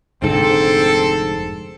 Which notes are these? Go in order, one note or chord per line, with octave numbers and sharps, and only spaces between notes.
F1 G#2 D3 C4 A4